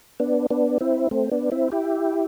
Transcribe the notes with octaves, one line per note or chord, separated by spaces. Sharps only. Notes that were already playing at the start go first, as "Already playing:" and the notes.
B3 D4
B3 D4
C4 E4
A3 C4
B3 D4
C4 E4
E4 G4